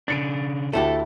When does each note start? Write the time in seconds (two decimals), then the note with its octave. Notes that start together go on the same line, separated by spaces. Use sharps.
0.08 C#3 D4 A6 C#7 D7
0.73 D2 A3 E4 G4 A4 E5